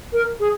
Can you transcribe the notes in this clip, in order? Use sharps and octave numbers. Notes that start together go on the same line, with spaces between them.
A#4
G#4